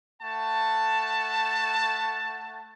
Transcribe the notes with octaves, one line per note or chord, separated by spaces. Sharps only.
A3 F#5 A5